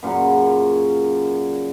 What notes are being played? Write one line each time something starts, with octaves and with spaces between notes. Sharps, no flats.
F#2 A#2 C#3 F#3